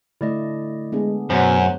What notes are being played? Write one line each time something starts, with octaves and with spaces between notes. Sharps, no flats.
D3 A3 E4 D5 D#5
G#3 B3 D4 G#4
F#2 B2 C5 C#5 F#5